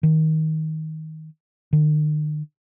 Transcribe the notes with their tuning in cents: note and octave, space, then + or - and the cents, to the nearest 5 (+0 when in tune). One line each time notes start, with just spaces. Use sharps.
D#3 +20
D#3 -45